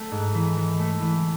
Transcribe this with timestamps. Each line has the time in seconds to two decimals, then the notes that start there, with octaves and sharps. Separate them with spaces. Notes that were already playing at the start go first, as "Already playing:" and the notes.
Already playing: A3
0.12 G#2
0.34 E3
0.57 E3
0.79 A3
1.02 E3